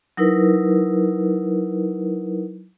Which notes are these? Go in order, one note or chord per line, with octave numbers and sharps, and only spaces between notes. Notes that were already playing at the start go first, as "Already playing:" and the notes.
F#3 D#4 E4 A#4 B4